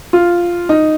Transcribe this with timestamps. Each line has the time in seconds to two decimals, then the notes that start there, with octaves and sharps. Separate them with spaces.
0.13 F4
0.69 D#4